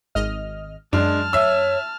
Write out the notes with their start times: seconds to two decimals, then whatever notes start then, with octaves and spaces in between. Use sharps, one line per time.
0.15 G#1 D#5 F6
0.93 F#2 G#3 D4 A5 F6
1.33 C#5 E5 E6